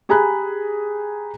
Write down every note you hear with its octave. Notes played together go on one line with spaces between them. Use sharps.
G4 G#4 G#5 A#5 B5 F#6